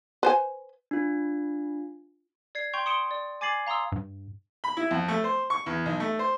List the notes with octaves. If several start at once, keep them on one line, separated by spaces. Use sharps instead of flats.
B4 C5 G#5
D4 F4
D5 G#6 C7
G5 C6 C#6 G6 F7
C6 D#6 C#7 D7 E7 G7
D5
G#5 D6 G#6 A6 C7 F#7
F5 A#5 C6 D#6 E6
G2
B5
E4
F2
A3
C5
C#6
E2
B1
A3
C5